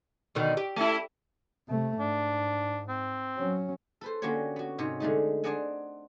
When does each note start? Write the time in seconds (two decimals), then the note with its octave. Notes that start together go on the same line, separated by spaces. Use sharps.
0.35 B2 D3 D#3
0.57 G4
0.76 A3 E4
1.68 C3 A3
2.00 G#2 D4
2.89 C4
3.37 F#3 C#4
4.01 A4 B4 C5
4.22 D3 A#3 C#4 F#4 G4 C#5
4.56 B3 F#4
4.78 G#2 C3 D#4 C#5
5.00 D3 G#3 A3 D#4
5.44 D4 C5 D5 D#5 F#5 G#5